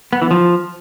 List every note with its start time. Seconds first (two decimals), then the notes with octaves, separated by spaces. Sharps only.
0.13 B3
0.22 E3
0.31 F3